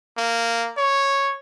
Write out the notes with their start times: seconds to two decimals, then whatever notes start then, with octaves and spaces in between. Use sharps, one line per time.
0.17 A#3
0.77 C#5